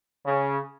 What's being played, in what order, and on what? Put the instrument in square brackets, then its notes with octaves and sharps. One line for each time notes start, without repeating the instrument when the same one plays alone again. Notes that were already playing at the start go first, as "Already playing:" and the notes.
[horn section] C#3